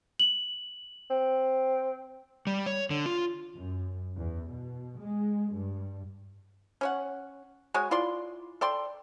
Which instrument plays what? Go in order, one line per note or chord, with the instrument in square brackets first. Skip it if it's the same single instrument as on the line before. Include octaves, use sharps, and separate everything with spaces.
[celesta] F#7
[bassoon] C4
[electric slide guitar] G3
C#5
D3
F4
[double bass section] F#2
E2
B2
G#3
G2
[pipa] C#4 C#5 F#5
G#3 F#4 C#5 G#5
E4 F4 D5 C6
A4 D5 G5 C6